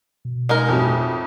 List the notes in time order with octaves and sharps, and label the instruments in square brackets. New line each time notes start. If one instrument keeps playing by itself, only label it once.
[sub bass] B2
[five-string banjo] G#3 D#4 A#4
[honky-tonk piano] F2 A2 F#3